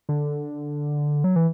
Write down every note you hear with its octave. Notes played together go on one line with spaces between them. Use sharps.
D3
F#3
E3